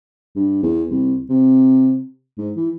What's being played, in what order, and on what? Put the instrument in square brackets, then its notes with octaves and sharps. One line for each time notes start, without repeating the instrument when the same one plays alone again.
[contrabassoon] G2
E2
C2
C3
G#2
E3